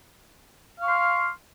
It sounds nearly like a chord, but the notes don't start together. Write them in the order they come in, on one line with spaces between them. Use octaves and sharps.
F5 C#6 C6 F6